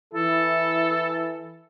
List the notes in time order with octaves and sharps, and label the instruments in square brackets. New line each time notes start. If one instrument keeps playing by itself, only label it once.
[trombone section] E3 E4 [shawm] A4